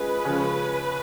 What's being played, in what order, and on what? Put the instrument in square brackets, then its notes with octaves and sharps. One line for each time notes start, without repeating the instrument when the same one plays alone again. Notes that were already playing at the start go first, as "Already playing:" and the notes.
Already playing: [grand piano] G#3 C#4 F4 G#4 [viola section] B4
[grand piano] C#3 F3 G#3 C#4